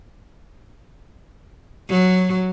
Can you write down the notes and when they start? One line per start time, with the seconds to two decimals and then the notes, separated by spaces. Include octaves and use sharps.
1.89 F#3